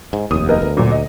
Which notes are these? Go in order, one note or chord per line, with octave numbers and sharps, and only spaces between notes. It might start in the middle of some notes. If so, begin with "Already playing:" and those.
G#2
F1 D#2 D#6
B3 A#4 D#5
D2
A#2 F#3
D#5